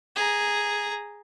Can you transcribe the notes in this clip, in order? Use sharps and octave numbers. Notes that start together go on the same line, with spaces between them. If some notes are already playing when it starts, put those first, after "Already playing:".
G#4 A#5